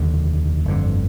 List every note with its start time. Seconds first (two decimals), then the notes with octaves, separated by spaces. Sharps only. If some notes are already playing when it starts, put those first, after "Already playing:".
Already playing: F1 D#2 D3
0.65 G1 F2 D3